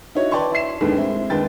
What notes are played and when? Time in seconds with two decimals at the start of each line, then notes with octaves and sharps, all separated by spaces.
0.15 D#4 E4 F#4 C#5
0.31 B4 D5 G5 A5 C6 C#6
0.52 E4 E5 C7 E7
0.81 D#2 A2 D#3 G#3 B3 D4
0.95 G#3 C4 E4
1.30 D#2 G#3 B4 G5 A6